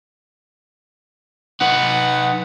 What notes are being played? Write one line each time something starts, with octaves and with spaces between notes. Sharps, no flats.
D#4 B4 F#5